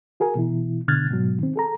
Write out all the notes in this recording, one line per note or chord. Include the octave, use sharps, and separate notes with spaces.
F#4 G#4 A#4 G#5
B2 E3 E4
B2 D3 F6 F#6 G#6 A6
G#2 B2 F#3
D#3 C4
G#4 A4 A#5